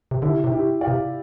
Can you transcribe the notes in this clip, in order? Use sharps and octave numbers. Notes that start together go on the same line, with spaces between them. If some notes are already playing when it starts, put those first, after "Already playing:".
C3
D3 E4 G4
C3
E4 G4
D5 F5
C3